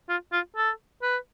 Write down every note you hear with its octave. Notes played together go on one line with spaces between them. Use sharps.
F4
F4
A4
B4